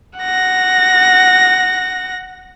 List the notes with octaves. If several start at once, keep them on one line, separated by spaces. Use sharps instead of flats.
F#5 A#6